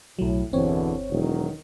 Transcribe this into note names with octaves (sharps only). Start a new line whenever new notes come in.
B1 A2 F#3
G1 E2 B2 D3 E3 C4 C#5
E1 D#3 E3 F#3